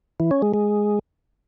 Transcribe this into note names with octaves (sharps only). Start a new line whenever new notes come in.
E3
C#4
G#3
G#3